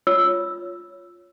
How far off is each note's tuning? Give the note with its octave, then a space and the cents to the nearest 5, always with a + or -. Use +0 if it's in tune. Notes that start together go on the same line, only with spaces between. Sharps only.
F4 +0 C#5 +0 E6 +0